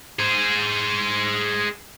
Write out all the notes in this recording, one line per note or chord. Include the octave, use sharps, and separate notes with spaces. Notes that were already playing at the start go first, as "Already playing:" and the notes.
G#4 C5